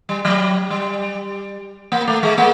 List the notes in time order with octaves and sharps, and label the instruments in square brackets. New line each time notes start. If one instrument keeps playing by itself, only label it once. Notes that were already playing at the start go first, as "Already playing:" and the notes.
[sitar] G3
F#3
G3
A#3
A3
G#3
A#3